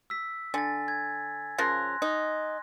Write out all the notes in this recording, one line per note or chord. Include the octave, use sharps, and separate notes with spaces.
E6 B6
D3 G#5 A6
G#6
C#3 F3 A#4 C6 F#6 A#6
D#4